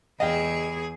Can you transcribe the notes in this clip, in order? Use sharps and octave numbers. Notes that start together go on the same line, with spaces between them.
E2 G#4 D#5 F5 G5